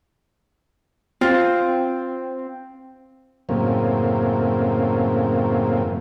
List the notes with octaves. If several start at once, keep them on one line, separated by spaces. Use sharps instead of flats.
C4 F4
F#2 A2 C#3 A#3 C4